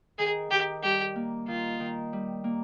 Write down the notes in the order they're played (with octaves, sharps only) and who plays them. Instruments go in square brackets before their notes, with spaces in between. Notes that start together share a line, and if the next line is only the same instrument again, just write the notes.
[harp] D#3 [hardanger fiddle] G#4
[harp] D#3 [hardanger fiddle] G4
[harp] G3 [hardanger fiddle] G4
[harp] A#3
[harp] D#3 [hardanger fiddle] F4
[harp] D#3
G3
A#3